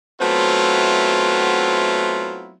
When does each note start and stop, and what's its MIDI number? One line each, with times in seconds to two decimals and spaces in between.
0.21 2.54 54
0.21 2.54 57
0.21 2.54 59
0.21 2.54 60
0.21 2.54 64
0.21 2.54 65